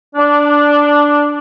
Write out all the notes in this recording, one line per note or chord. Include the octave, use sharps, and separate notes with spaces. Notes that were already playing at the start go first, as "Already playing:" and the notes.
D4